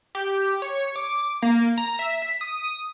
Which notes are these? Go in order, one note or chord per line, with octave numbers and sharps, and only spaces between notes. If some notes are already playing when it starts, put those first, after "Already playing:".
G4
C#5
D6
A#3
A#5
E5
B6
D#6